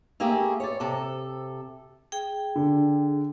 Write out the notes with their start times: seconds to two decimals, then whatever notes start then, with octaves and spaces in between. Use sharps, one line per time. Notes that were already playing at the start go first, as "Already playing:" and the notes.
0.20 A3 A#3 E4 G4 G#4
0.60 C#5 D5
0.80 C3 A4
2.12 G#4 G5
2.56 D3